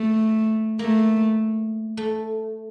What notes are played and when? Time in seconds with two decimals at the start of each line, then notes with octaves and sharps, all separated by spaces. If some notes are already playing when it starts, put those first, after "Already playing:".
Already playing: A3
0.79 A3 A#3
1.97 A3